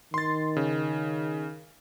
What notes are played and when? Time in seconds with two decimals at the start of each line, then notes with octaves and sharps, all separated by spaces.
0.14 D#3 C6 A6
0.56 C#3